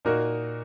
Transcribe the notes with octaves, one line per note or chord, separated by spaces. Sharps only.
A#2 A#3 D#4 F#4 A#4